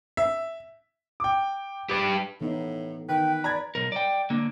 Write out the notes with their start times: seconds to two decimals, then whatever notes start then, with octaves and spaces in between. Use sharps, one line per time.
0.17 E5
1.20 G5 D6
1.89 G4 B4 D6 D7
2.41 A2 E3 B3 D#4
3.09 D#3 B4 G5
3.44 D5 A#5 B5 G#6
3.75 B1 A#4
3.92 D5 G5
4.30 D3 A#3